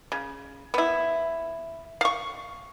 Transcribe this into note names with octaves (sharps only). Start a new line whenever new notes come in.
C#3
B3 E4
F5 C#6